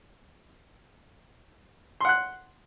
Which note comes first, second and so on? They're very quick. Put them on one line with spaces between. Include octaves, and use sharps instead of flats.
C6 F#5 F#6